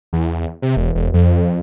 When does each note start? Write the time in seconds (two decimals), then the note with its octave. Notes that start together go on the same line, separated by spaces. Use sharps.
0.13 E2
0.62 C3
0.77 E1
0.95 E1
1.14 F2